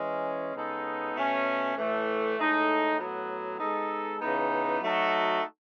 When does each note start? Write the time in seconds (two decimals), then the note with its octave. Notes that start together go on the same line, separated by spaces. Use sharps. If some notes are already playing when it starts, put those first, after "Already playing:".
Already playing: E3 G#3 C#4
0.54 C#3 G#3 B3 D#4 A4
1.14 B2 A3 C#4
1.75 A2 E3 A3
2.37 A2 G#3 D#4 A4
2.97 A2 F#3 B3
3.58 G#3 B3 D#4 A4
4.20 C#3 E3 B3 D#4
4.81 F#3 A3 D#4 F#4 A4